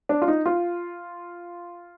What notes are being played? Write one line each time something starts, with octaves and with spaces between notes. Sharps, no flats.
D4
F4
D#4
F4